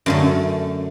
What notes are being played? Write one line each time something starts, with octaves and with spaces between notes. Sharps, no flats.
F#2 D3 A3